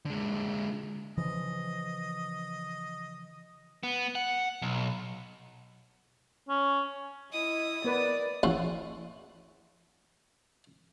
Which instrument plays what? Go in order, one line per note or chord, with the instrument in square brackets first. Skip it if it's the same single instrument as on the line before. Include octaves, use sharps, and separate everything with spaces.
[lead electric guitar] D3 G#3
[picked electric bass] C#3 E3 F3 [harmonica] D#5
[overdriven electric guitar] B3
F#5
B1
[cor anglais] C#4
[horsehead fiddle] E4 [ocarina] D#5 [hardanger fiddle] D#6
[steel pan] B3 B4 [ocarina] A#4 [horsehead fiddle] D5
[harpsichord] A#1 C#4 E4 F#5 C6